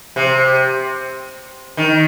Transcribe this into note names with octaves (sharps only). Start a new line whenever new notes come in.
C3
D#3